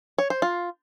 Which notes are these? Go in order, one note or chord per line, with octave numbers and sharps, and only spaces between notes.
C#5
C5
F4